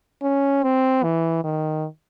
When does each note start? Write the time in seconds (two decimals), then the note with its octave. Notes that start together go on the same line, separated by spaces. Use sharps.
0.22 C#4
0.63 C4
1.03 E3
1.44 D#3